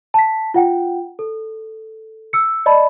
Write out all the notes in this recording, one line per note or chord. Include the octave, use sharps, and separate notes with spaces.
A5 B6
F4 F#5 G5
A4
E6 C#7
D5 D#5 A5 B5